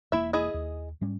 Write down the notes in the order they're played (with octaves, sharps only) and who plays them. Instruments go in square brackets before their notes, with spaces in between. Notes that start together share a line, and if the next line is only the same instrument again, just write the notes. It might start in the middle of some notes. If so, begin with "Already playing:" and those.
[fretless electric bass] E1 A#3 [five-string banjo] E4 E5
[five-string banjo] E4 G#4 D#5
[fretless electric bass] D#2
G#2 G3 C#4